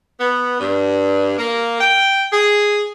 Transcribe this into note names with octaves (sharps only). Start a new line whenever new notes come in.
B3
G2
A#3
G5
G#4